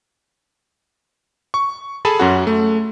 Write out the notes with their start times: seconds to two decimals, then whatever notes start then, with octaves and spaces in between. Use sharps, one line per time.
1.54 C#6
2.05 G#4 A4 G#5 A5 B5
2.20 F#2 C#4 F#4
2.47 A3